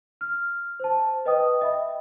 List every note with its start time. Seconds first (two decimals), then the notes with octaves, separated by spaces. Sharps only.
0.21 F6
0.80 C5 A5
1.25 B4 D#5 G5 D#6
1.61 D#5 E5 G5 B5